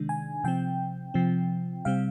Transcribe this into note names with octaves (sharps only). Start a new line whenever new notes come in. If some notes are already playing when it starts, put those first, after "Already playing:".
Already playing: C3 D#3 G#3 D4
G#5
C3 F3 C4 G5
C3 F3 C4
C3 G3 C4 F5